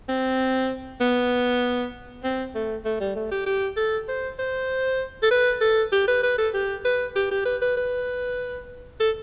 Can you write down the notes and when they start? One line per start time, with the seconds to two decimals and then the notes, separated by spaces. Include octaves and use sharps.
0.09 C4
1.01 B3
2.24 C4
2.55 A3
2.85 A3
3.00 G3
3.16 A3
3.31 G4
3.46 G4
3.77 A4
4.08 C5
4.39 C5
5.23 A4
5.31 B4
5.61 A4
5.92 G4
6.08 B4
6.23 B4
6.38 A4
6.54 G4
6.85 B4
7.16 G4
7.31 G4
7.45 B4
7.62 B4
7.77 B4
9.00 A4